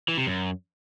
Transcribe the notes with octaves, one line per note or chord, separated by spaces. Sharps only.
E3
C3
F#2